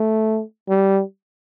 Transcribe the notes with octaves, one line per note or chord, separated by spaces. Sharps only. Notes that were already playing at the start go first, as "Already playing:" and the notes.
Already playing: A3
G3